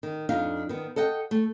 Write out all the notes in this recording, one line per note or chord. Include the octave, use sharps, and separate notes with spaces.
D#3
F2 D4 D#4 F5
D#3 B3
A4 D#5 F#5 G5
A3